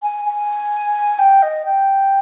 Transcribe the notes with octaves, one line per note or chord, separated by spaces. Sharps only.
G#5
G#5
G5
D#5
G5